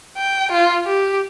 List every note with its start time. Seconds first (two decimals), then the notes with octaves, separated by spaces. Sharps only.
0.17 G5
0.51 F4
0.86 G4